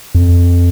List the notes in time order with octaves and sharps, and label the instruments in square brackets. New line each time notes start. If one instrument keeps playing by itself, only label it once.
[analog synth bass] F2